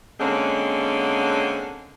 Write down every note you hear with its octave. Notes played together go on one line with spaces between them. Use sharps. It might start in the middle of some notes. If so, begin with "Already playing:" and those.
D3 G#3 A#3 C4 C#4